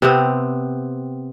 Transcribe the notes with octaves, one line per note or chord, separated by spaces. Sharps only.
C3 B3 C4